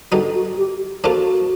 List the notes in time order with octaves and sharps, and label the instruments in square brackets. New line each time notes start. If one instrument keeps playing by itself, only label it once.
[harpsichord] D3 G3 B3 D#4 [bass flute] F#4
[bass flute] F#4
G4
[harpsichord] F3 A#3 D4 F4 A4 [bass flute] F#4